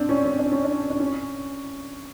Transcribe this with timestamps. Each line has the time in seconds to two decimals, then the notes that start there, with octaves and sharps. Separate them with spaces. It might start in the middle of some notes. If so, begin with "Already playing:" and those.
Already playing: C4 D4
0.09 C#4
0.25 C#4
0.39 D4
0.52 C#4
0.64 D4
0.90 D4
1.00 C#4